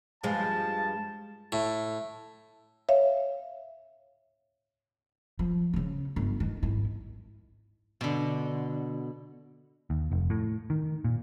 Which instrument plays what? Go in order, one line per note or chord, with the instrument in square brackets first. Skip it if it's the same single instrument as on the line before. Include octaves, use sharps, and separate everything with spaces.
[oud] G2 F3 G#3 [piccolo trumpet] A5
[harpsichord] A2
[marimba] C#5 E5 F5
[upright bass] F3
C#3 C#4
G1
D#3
G#1 E4
[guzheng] B2 D3
[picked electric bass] D#2
F1
A2
D#3
A#2